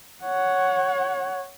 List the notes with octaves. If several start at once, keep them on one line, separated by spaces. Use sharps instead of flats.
C#5 F#5